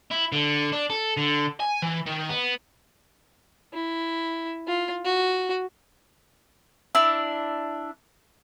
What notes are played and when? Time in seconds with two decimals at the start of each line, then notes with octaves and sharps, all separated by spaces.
0.11 E4
0.32 D3
0.72 D4
0.90 A4
1.17 D3
1.60 G#5
1.82 E3
2.06 D#3
2.29 B3
3.73 E4
4.67 F4
5.04 F#4
6.95 D4 E4 D6 E6